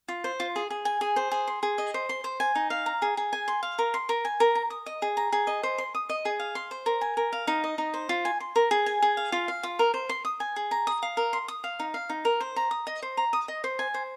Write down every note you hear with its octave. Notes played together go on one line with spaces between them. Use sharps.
F4
C5
F4
G#4
G#4
G#5
G#4
C5
G#4
C6
G#4
D#5
C5
C6
C5
G#5
D#4
F5
A#5
G#4
G#4
G#5
C6
F5
A#4
C6
A#4
G#5
A#4
A#5
D#6
D#5
G#4
A#5
G#4
D#5
C5
C6
D#6
D#5
G#4
F5
C6
C5
A#4
G#5
A#4
F5
D#4
D#5
D#4
C5
F4
G#5
C6
A#4
G#4
G#5
G#4
F5
F4
F5
F4
A#4
C5
C6
D#6
G#5
G#4
A#5
D#6
F5
A#4
C6
D#6
F5
D#4
F5
D#4
A#4
C5
A#5
D#6
D#5
C5
A#5
D#6
D#5
C5
G#5
C5